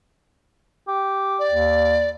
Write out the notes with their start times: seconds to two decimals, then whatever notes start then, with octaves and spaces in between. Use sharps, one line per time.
0.88 G4
1.39 D5
1.51 D#2